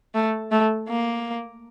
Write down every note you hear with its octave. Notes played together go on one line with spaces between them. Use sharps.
A3
A3
A#3